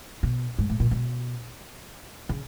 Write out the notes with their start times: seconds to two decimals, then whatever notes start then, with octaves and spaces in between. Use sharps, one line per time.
0.23 B2
0.59 G#2
0.70 A2
0.80 A#2
0.91 B2
2.29 C#3